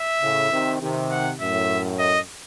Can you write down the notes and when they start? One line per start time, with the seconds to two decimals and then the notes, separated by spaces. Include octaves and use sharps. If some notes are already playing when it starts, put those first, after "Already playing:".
Already playing: E5
0.22 A2 C#3
0.51 C3 D#3
0.81 C3 D#3
1.11 F#5
1.40 F#2 A2 E5
1.99 D#5